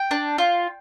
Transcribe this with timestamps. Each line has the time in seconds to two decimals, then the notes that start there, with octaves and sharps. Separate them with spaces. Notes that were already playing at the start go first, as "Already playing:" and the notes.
Already playing: G5
0.11 D4
0.38 F4